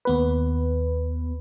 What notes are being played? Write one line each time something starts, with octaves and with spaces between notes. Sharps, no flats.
D#2 B3 B4